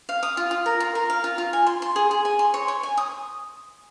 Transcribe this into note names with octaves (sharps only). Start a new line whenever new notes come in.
F5
D#6
F4
F4
A#4
F4
A#4
F5
F4
F4
G#5
C6
C6
G#4
G#4
G#5
C6
C#5
C#5
G#5
D#6